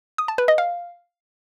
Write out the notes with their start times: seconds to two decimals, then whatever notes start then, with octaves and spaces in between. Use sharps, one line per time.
0.18 D#6
0.28 A5
0.38 B4
0.48 D#5
0.58 F5